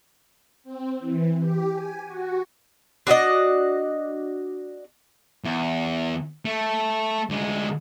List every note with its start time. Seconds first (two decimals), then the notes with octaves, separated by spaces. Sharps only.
0.64 C4
0.99 E3
1.39 G4
1.72 G#5
2.04 F#4
3.07 D4 F#4 D5 D#5
5.44 E2
6.45 A3
7.30 D2 G#3